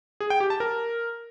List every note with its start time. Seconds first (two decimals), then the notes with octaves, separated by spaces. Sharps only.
0.20 G#4
0.30 G5
0.40 G4
0.50 A5
0.60 A#4